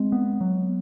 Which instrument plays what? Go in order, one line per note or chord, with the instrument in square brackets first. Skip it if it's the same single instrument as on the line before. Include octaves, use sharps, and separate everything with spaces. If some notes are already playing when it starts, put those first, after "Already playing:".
Already playing: [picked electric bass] G#3 [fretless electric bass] C4
[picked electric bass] B3
F#3